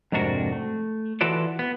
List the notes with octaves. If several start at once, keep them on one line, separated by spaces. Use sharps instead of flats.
F2 G#2 C3 D4 F#4 A#4
A3
E3 F4 F#4 A4 B4 D5
B3